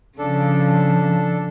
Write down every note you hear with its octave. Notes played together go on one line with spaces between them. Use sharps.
C#3 F3 D4 A4